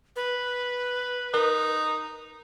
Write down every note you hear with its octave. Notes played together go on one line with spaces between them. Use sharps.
B4
D#4 A#4